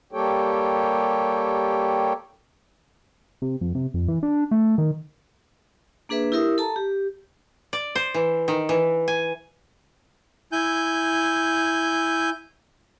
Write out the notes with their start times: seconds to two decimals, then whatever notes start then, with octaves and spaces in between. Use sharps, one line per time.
0.13 G3 A#3 G4 A4 C#5 G5
3.42 C3
3.61 F2
3.75 C3
3.94 F2
4.08 E3
4.23 D4
4.51 A3
4.78 D#3
6.09 A#3 D4 G#4 B4 E5
6.32 E4 G4 A#4 E5 D#6
6.58 A4 A5 A#5
6.76 G4
7.73 D5
7.95 C5
8.14 E3
8.48 D#3
8.69 E3
9.08 G#5
10.52 E4 G#5 G6